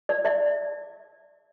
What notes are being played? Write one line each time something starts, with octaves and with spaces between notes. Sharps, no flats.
D5
D5 E5